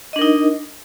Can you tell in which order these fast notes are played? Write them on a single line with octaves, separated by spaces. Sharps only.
D#5 D4 A#4 D#4